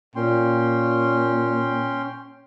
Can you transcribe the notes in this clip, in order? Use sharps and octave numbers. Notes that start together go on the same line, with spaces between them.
A#2 C#4 G5 C6